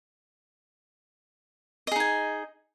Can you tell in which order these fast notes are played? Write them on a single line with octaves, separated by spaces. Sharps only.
D#5 G#4 D#4 G#5